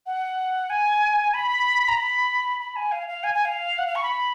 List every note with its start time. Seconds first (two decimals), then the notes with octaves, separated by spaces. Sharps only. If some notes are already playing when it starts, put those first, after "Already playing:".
0.06 F#5
0.70 G#5
1.34 B5
1.88 A#5
1.97 B5
2.60 B5
2.76 G#5
2.92 F5
3.08 F5
3.23 G#5
3.34 G#5
3.45 F5
3.78 F#5
3.87 F5
3.95 C#6
4.03 B5